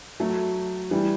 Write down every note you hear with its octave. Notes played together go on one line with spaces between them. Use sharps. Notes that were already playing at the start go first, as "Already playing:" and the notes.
F#3 A3
E3 G3